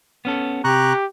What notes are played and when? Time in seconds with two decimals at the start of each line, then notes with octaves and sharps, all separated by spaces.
0.25 B3 C#4 A4
0.64 C3 G4 A#5 C#6 F#6